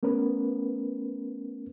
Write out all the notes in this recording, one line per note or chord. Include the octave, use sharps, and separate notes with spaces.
A3 B3 C#4 A#4 B4